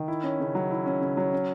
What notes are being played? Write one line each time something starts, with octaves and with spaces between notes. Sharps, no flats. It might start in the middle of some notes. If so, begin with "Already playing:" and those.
Already playing: D#3
E4
C#4
C#3
F#3
E4
C#4
C#3
F#3
C#4